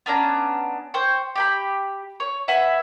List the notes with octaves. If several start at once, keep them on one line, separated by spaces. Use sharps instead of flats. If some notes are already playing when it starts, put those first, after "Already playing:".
B3 C#4 D4 A#5
C5 G5 C#6
G4 G5 B5
C#5
B4 E5 F#5 G#5